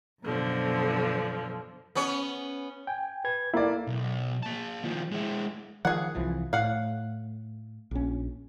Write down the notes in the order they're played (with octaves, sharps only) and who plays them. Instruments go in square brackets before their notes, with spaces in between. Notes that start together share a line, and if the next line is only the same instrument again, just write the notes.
[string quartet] F#2 B2 D3 F3
[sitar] B3 C#4 C#5
[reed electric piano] G5 G#5
B4 G#6
[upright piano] A#3 D5 [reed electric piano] E4 A4
[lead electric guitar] B1
A#3 A5
D#3 F3
G#3 E4
[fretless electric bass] D#3 F3 [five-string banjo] G#4 F#5
[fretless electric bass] C2 E3 F3
[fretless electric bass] A2 [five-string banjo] F5 F#5
[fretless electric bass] A#1 C#4